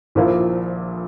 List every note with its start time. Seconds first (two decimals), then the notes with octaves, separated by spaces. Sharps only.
0.15 A#1 A#2 F3 A#3 E4